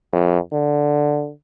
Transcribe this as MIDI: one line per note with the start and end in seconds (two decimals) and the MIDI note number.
0.13 0.38 41
0.52 1.32 50